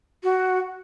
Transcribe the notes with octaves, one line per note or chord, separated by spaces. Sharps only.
F#4